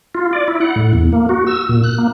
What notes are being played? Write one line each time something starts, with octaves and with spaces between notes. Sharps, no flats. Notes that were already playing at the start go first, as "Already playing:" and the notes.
F4
D5
E4
F#5
A2
E2
A#3
F#4
E6
A#2
F#6
A#3